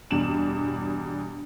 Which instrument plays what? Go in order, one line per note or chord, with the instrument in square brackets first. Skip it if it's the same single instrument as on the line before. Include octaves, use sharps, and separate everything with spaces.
[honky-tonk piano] E2 G2 B2 E7 F#7